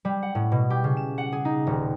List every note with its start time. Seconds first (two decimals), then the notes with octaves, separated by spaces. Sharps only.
0.05 G3
0.23 F#5
0.35 A2
0.52 B2
0.70 G4
0.84 C#3
0.97 E7
1.18 F#5
1.32 G#4
1.45 D#4
1.67 D#1